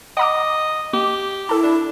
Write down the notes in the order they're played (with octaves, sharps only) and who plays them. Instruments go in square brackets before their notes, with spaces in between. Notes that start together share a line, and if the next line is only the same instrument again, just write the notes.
[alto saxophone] D#5 [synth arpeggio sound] F#5 A#5 D6
[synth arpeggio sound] A#3 [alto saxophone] G4
[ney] E4 [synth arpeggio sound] A4 A5
[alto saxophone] D4